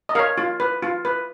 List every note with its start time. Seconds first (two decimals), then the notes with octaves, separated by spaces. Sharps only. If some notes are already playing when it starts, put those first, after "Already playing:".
0.09 D#5
0.15 A#4 C#5 F5
0.38 F4
0.60 B4
0.83 F4
1.05 B4